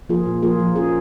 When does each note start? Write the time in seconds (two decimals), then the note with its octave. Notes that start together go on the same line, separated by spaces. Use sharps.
0.09 F3 A#3 F4 G#4
0.26 A#2
0.42 F3 A#3 F4 G#4
0.60 F3
0.76 C#4 F4 G#4